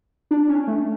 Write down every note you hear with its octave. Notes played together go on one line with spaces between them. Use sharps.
D4
C#4
A3